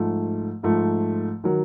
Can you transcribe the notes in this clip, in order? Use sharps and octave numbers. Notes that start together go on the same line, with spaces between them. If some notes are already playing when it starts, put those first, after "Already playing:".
Already playing: G#2 F3 A3
G#2 F3 A3
D#3 F#3